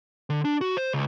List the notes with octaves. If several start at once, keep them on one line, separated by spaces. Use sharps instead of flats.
D3
D4
F#4
C5
C#2